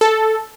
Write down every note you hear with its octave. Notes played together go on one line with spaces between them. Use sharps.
A4